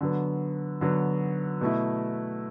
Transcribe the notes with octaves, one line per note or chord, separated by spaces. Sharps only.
D3 F#3 B3
D3 F#3 B3
B2 A3 E4